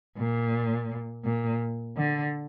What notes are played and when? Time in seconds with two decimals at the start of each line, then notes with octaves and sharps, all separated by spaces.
0.18 A#2
1.25 A#2
1.97 D3